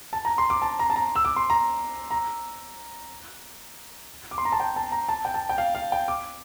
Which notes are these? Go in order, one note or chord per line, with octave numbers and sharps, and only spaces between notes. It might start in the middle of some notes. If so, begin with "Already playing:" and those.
A5
A#5
C6
D6
A5
A#5
A5
A#5
E6
D6
C6
A#5
A#5
D6
C6
A#5
A5
G5
A5
A#5
A5
G5
A5
G5
F5
F5
G5
D6